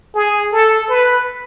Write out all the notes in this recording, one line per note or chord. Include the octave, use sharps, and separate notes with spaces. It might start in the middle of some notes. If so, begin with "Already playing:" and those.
G#4
A4
B4